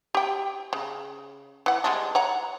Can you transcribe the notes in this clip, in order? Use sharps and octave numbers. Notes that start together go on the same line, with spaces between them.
G4 G5
C#3
E3 F#5
G3 G#3 D4
C#5 F#5 A#5